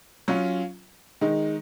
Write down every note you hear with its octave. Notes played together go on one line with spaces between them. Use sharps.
F#3 C#4 F4
D#3 G#3 D#4